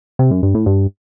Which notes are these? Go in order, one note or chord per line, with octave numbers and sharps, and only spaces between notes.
C3
F#2
G2
A2
G2